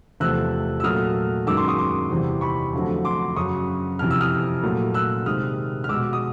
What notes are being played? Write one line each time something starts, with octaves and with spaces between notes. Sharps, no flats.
E2 C3 F3 A3 E6 F#6
E6
A#2 F#3 A3 D#6 F6
F#2 D#3 G#3 D6 E6
C6 D6
C#6 D#6
C6 D6
E2 C3 E3 G3
B5 C#6
F2 D3 F#3 A3
C6 D6
F#2 C#3 F#3 C#6 D#6
F2 C3 E3 F6
E6
D#6 F6
A#2 F#3 A3
E6 F#6
C3 D#3 G#3 D#6 F6
F6
B2 G#3 D6 E6
D#6